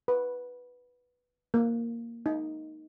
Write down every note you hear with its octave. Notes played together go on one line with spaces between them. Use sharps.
B4
A#3
D#4